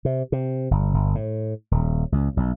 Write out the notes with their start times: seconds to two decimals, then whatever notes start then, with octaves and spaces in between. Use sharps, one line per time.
0.05 C3
0.32 C3
0.71 G1
0.94 G1
1.15 A2
1.71 D#1
2.12 C#2
2.37 B1